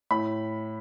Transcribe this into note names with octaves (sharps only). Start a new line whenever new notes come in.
A2 B5